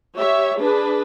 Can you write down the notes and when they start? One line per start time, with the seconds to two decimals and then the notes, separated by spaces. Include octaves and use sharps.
0.14 G4 C#5 E5
0.58 D4 G#4 B4